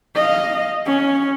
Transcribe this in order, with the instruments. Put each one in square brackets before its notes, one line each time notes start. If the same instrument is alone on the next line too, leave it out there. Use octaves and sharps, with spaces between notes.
[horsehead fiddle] D#5 F5
C#4